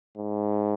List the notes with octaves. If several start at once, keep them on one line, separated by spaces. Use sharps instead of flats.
G#2